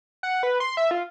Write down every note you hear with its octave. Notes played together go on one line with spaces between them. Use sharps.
F#5
B4
C6
E5
F4